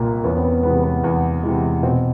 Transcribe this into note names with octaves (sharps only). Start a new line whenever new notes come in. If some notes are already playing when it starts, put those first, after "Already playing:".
Already playing: C2 A#2 A#3 C4
E2 B3 C#4
C4
B3
C3 E3 G#3 B3
B3
E2
C3 E3 G#3
B2 C4